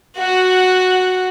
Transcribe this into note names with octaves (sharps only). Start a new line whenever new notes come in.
F#4 F#5